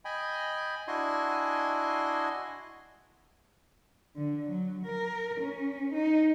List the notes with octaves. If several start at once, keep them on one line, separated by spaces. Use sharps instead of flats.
D#5 G5 G#5 B5
D4 E4 F#4 D#5 G#5 C6
D3
F#3
A#4
C#4
D#4